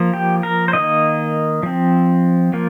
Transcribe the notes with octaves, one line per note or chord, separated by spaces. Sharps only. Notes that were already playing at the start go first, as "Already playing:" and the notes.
Already playing: F3 A#3
G4
A#4
C5
D#3 A#3 D#5
F3 C4
F3 A#3